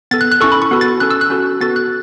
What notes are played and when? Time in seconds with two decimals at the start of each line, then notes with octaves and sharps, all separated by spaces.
0.11 B3 A4 A6
0.21 F#6
0.32 F#6
0.41 C#4 E4 A4 C#6
0.52 B5
0.62 C#6
0.71 B3 F#4 A4
0.81 A6
1.00 C#4 A4 F#6
1.11 E6
1.21 F#6
1.30 C#4 F#4 A4
1.61 B3 F#4 A4 A6
1.76 F#6